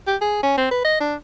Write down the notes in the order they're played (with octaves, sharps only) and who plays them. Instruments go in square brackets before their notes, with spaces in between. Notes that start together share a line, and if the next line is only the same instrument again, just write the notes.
[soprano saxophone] G4
G#4
C#4
C4
B4
D#5
D4